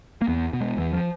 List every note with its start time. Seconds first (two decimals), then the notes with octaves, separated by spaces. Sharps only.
0.22 A#3
0.28 E2 B3
0.53 B2
0.61 G#3
0.77 E2 E3
0.93 F3